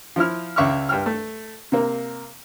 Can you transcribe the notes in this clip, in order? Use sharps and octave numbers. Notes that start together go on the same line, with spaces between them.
F3 E4 F6
C#2 C#3 E5 C#6 D6 F6
G2 G5 F6
A3
C3 A#3